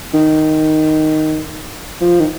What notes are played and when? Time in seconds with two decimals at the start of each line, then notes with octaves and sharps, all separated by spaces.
0.14 D#3
2.01 F3
2.20 D#3